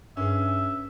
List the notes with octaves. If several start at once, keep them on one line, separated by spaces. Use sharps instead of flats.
G2 C#4 G#4 E5